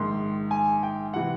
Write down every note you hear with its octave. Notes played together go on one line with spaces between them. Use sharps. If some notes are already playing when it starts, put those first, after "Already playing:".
Already playing: A#1 G#2 D#3 C6
G#5
G5
C3 E3 F#5